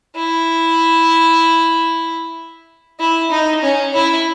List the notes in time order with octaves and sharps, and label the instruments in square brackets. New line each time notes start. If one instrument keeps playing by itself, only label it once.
[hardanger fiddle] E4
E4
D#4
C#4
E4